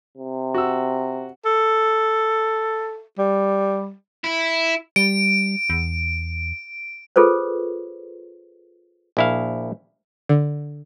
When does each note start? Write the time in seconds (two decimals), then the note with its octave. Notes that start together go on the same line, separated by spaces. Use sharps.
0.17 C3
0.54 F#4 E6
1.46 A4
3.18 G3
4.24 E4
4.96 G3 D7
5.70 E2
7.16 F4 G#4 A4 B4 C5
9.17 A#1 E4 F5
10.29 D3